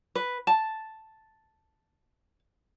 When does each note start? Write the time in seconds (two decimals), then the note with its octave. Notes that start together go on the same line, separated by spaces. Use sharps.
0.15 B4
0.47 A5